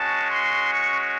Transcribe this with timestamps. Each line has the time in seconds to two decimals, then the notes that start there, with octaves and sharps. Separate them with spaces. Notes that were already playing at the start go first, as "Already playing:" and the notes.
Already playing: G#3 C#4 F#4 A5
0.31 C6
0.74 C#6